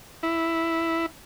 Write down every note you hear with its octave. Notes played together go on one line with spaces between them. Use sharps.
E4